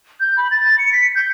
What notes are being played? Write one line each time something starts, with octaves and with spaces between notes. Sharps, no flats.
G6
B5
A6
C#7
B6
G6